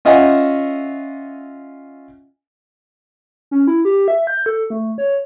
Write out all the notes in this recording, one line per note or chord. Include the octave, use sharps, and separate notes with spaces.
C#4 F4 D#5 E5 F#5 G#5
C#4
E4
G4
E5
G6
A4
A3
C#5